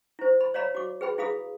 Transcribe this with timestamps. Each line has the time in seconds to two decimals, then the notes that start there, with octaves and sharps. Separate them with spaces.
0.19 E4 C5
0.41 B5
0.54 C#5 D5 F5 A#5 B5
0.75 F#4 D6
1.01 G#4 B4 G5 B5
1.18 E4 G#4 F5 B5 D#6